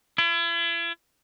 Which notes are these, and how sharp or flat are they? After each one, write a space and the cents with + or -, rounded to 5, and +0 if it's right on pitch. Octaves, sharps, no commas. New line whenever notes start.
E4 +40